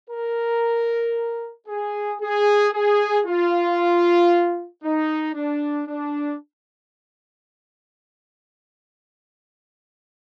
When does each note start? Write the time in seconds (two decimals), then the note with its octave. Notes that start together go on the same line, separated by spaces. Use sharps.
0.10 A#4
1.68 G#4
2.21 G#4
2.73 G#4
3.25 F4
4.83 D#4
5.34 D4
5.87 D4